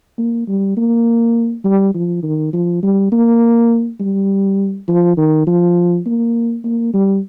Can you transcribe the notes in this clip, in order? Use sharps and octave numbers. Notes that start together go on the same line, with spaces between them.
A#3
G3
A#3
G3
F3
D#3
F3
G3
A#3
G3
F3
D#3
F3
A#3
A#3
G3